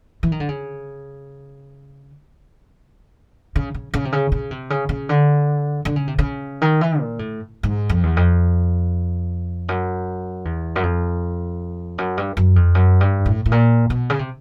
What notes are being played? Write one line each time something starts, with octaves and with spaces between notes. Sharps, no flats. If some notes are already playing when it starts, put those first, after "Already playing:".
E3
D#3
D3
C#3
C#3
C#3
C#3
C3
C#3
C#3
C3
C#3
C#3
D3
D3
C#3
C3
C#3
D#3
E3
A#2
A2
G#2
F2
E2
F2
F#2
E2
F#2
F2
F#2
G2
F#2
F2
F#2
G2
A2
A2
A#2
B2
C#3
C3